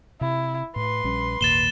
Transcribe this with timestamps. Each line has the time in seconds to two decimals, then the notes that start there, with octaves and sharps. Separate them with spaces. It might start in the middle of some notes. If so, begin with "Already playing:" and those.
0.21 C3 E4
0.76 A2 B4 C6
1.04 A#1 G3 C#4
1.41 G#1 D#2 A#2 A6 E7 G7